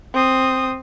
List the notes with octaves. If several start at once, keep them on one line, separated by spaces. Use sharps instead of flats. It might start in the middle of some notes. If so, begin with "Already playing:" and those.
C4 D#6